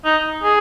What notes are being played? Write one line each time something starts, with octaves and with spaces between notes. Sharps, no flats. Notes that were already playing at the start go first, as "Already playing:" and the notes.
D#4
G#4